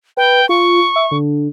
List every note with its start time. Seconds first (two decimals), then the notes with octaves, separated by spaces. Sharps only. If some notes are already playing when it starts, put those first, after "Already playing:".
0.17 B4 G5
0.49 F4 C#6
0.96 E5
1.11 D3